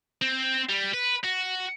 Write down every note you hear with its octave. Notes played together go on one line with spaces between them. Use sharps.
C4
G3
B4
F#4